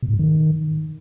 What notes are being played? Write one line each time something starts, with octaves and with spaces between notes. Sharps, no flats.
B2
G#2
G2
D#3